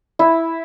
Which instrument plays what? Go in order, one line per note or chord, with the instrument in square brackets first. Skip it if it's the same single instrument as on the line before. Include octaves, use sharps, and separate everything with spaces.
[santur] E4